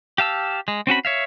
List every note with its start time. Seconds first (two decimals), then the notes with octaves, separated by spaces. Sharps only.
0.18 G4 F5 A5 E6
0.68 G#3
0.87 C4 C#4 F#4 B5
1.05 C#5 E5 F5